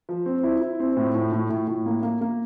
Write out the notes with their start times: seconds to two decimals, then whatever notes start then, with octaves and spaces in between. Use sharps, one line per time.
0.09 F3
0.26 C4
0.43 E4
0.61 E4
0.80 C4
0.97 A2
1.15 A2
1.32 A2
1.50 A2
1.67 A2
1.86 A#3
2.03 A#3
2.21 A#3